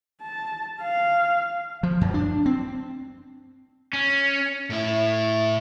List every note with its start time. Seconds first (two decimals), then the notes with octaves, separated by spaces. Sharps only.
0.22 A5
0.82 F5
1.83 F3
2.01 F#2
2.14 D4
2.46 C4
3.93 C#4
4.70 A2 E4